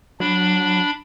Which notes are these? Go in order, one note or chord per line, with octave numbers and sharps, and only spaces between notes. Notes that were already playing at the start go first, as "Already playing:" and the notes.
F#3 D4 B5